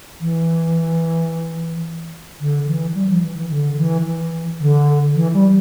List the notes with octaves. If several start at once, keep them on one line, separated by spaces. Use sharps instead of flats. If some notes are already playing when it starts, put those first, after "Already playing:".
E3
D3
E3
G3
F3
E3
E3
D3
E3
E3
D3
E3
G3